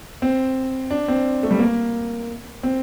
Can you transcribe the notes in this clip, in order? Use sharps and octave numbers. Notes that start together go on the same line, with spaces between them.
C4
D4
C4
A3
G3
A#3
C4